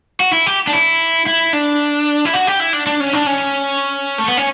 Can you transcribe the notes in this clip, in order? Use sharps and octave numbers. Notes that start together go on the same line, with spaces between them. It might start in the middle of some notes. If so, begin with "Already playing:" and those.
F#4
E4
G4
D4
E4
E4
D4
E4
F#4
G4
E4
D4
D4
C#4
D4
C#4
A3
B3
C#4